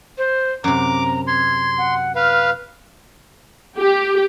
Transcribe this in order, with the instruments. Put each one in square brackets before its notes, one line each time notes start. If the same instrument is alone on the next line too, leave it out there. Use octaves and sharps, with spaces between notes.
[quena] C5
[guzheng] F#2 C3 [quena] A#5 [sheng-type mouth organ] D6
[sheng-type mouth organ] C6 [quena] G#6
[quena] F#5
[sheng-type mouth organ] B4 F5 [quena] F6
[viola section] G4